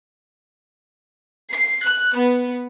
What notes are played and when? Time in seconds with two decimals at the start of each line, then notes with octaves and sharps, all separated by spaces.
1.52 C7
1.84 F#6
2.15 B3